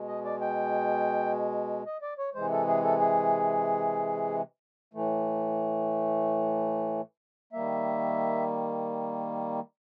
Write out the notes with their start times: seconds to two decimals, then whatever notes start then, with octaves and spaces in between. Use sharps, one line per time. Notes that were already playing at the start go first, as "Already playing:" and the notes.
Already playing: B2 G#3
0.08 D#5
0.24 D5
0.41 G5
1.86 D#5
2.02 D5
2.18 C#5
2.35 C3 E3 G#3 C5
2.51 A4
2.67 G#4
2.83 A4
3.00 G#4
4.94 A2 E3 A3
7.53 D#3 G3 A#3 E5